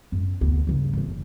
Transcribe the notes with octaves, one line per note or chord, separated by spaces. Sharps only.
F#2
D2 B3
G2 C#3
F#1 E2